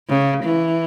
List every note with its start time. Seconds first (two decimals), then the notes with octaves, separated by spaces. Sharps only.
0.09 C#3
0.44 E3